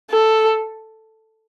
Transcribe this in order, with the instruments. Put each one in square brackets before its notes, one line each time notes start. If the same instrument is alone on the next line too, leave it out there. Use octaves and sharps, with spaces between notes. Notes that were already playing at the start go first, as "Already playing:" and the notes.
[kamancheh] A4